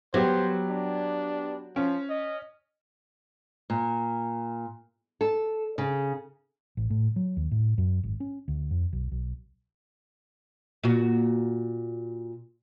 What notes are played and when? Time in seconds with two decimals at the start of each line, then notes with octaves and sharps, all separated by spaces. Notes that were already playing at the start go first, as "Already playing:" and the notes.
0.14 F#3 B3 G4 C5
0.69 D4
1.76 F3 C#4
2.09 D#5
3.70 A#2
5.21 A4
5.78 C#3
6.77 A1
6.90 A2
7.16 F#3
7.37 D#2
7.51 A2
7.78 F#2
8.03 G#1
8.20 C#4
8.48 D2
8.71 F2
8.93 B1
9.12 B1
10.84 A#2 F#4